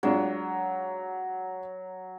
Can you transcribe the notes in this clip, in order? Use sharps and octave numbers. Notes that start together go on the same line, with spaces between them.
F#3 G#3 D4 F4